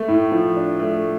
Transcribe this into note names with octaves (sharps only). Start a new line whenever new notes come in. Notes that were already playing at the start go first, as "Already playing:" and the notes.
Already playing: A3
A2
F3
D4
A3